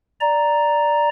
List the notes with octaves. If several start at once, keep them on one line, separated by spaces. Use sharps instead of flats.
D5 A#5